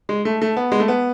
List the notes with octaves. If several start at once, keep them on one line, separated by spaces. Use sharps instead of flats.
G#3
A3
A3
B3
G#3
A3
B3